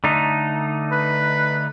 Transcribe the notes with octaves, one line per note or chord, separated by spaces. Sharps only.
D3 A3 D#4
B4